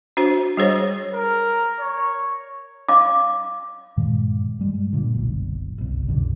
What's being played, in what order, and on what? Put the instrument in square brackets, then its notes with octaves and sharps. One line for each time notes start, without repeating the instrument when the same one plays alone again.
[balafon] D4 F#4 C5
G3 G#4 C5 C#5
[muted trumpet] A#4
C#5
[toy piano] F5 D6
[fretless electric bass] G2 A#2 D#3 G#3
G2 G3 G#3
A#2 D3
F#1 B1
G1 C2
C2 F#2 B2 D3